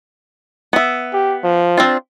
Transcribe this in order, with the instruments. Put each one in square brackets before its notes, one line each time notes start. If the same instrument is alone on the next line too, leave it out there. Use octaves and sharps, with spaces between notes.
[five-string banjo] B3 E5
[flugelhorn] G4
F3
[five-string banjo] C4 D4 F4